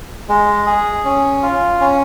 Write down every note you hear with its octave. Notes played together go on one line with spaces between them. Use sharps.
G#3
G#4
C#4
F4
C#4